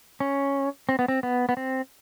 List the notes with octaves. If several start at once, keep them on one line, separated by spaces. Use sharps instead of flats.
C#4
C4
B3
C4
B3
B3
C4